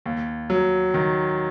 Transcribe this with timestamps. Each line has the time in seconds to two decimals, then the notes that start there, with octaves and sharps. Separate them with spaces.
0.06 D#2
0.50 F#3
0.94 D#3